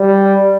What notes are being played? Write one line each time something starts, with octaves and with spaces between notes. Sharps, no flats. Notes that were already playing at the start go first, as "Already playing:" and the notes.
Already playing: G3